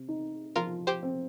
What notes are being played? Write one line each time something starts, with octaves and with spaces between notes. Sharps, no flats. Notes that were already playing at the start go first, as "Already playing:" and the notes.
Already playing: C3
D#4
F3 F4 A#4
G4 C5
C4